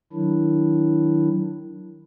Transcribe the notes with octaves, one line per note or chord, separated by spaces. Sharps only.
D#3 F#3 D4 E4